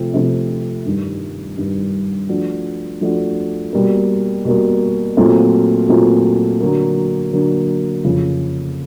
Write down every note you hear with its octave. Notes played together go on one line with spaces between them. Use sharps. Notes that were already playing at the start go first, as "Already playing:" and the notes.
Already playing: C3 F3 A3 C4
C3 F3 A3 C4
G2 D#3 G3
G2 D#3 G3
F3 A3 D4 F#4
F3 A3 D4 F#4
B2 G3 A#3
B2 G3 A#3
A#2 F#3 A3 C4 F4
A#2 F#3 A3 C4 F4
D3 F#3 A#3
D3 F#3 A#3
F2 C#3 F3